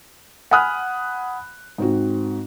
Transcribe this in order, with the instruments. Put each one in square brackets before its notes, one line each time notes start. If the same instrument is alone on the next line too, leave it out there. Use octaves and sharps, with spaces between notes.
[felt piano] F#5 G#5 B5 D#6 F6 F#6
G#2 C4 F#4